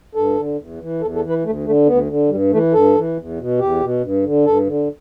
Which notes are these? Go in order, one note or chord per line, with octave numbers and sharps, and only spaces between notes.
G2 A4
D3
E2
E3
E2 A4
A4
E3
B4
D2 A3
D3 A3
D2 B3
D3
G2 G3
E3 A3
G2 A4
E3
E2
B2
E2 G4
B2
G2
D3
G2 A4
D3